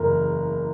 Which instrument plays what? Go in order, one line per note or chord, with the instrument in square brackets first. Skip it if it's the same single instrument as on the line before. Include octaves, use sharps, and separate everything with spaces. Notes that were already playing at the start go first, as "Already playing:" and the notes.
Already playing: [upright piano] F#1 E2 C#3 E3 A#4